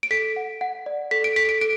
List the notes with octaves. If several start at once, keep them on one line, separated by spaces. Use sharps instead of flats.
D7
A4 B6
F#5
F#5
D5
A4 B6
D7
A4 B6
D7
A4 D7